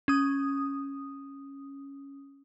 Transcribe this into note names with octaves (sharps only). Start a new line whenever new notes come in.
C#4 D#6